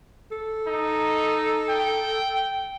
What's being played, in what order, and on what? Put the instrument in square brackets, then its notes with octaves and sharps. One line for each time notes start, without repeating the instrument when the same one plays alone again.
[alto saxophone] A4
[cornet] D#4
G5